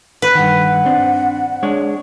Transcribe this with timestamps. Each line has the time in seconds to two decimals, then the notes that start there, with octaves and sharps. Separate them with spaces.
0.22 B4
0.35 G2 D#3 F#5
0.86 C4 D4
1.63 G#3 D4 C#5